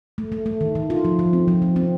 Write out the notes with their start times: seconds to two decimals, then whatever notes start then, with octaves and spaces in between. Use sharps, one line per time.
0.18 A3
0.32 A3
0.46 A3
0.61 D#3
0.75 D#3
0.90 F4
1.05 F3
1.19 F3
1.33 C4
1.48 F3
1.62 F3
1.76 C4